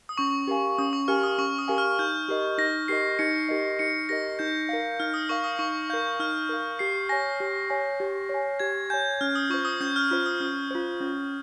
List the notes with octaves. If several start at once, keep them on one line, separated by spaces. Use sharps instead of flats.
D#6
C#4 C#6
G4 A#4 F5 G#5
C#4 D#6
C#6
G4 A#4 F5 G#5 F6
D#6
C#4 C#6
D#6
G4 A#4 F5 G#5
F6
D#4 G6
G4 A#4 D#5
D#4 A#6
G4 A#4 D#5 C7
D#4 C#7
G4 A#4 D#5
D#4 C#7
G4 A#4 D#5 A#6
D#4 G6
A#4 F5
D#4 F6
D#6
A#4 F5 C#6
D#6
D#4 C#6
A#4 F5 G6
D#4 F6
A#4 F5
G4 C7
C#5 G#5 A#6
G4
C#5 G#5
G4
C#5 G#5
G4 G#6
C#5 G#5 G6
C#4 F6
D#6
F4 C5 C#6
D#6
C#4 G6
F6
F4 C5 D#6
D#6
C#4 F6
F4 C5
C#4